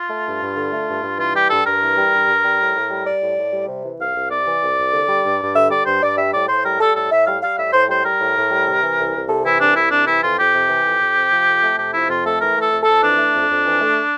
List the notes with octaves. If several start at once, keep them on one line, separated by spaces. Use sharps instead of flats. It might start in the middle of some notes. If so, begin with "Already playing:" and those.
Already playing: F4
A3
G2
G2
D3
A3
G2
G2
E3 F4
G3 G4
G2 A4
G2 A#4
E3
G3
G2
G2
G3
A2
A2
G3
G3 D5
A2
A2
G3
C3
E3
C2 F5
C2
C3 D5
E3
C2
C2
D3
G3
G2
G2
D3 E5
G3 D5
G2 C5
G2 D5
G3 E5
A2 D5
A2 C5
G3 A#4
G3 A4
A2 A4
A2 E5
G3 F5
G3 F5
A2 E5
A2 C5
G3 C5
G3 A#4
A2
A2
G3
C3
E3
C2
C2
C3 A4
E3 E4
C2 D4
C2 E4
C3 D4
E3 E4
F2 F4
F2 G4
C3
E3
F2
F2
C3
F3
F2
A3
C3 G4
F3 E4
F2 F4
A3 A4
E3 A#4
A3 A4
F2
A4
F2
E3 D4
A3
F2
F2
E3
A3